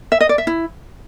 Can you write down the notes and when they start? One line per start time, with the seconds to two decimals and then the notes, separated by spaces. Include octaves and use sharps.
0.12 E5
0.21 D#5
0.29 D5
0.38 E5
0.47 E4